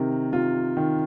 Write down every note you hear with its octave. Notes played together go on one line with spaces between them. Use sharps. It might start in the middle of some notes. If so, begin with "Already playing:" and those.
Already playing: C3 D#3 A#4
C3 F4
D#3